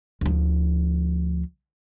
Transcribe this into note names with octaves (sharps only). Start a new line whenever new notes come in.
D2 F3